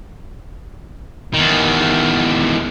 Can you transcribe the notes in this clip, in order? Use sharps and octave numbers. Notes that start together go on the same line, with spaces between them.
E2 D#3